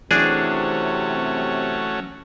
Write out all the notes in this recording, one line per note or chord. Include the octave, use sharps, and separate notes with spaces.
C3 E3 F#3 A3 C#4 D4 G#4